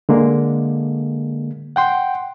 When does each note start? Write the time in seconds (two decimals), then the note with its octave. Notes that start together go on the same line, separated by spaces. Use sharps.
0.09 D3 G#3 A#3
1.76 F#5 G5 C6